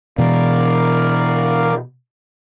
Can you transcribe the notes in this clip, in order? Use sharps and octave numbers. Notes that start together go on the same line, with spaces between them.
B2 E3 A#4 D5 F5